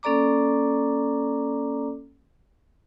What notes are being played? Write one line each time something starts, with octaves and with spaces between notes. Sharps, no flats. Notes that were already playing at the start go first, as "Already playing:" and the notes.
A#3 C#4 A4 D5 A#5 D6